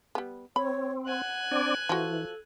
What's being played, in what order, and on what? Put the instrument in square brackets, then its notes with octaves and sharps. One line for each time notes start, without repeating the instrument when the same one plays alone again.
[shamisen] G3 B3
[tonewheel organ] C4 [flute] C#5 [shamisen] B5
[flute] F#5 [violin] G#5 F#6
[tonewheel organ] C4 D4 D5
[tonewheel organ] E3 [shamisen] F3 F#4 [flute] A4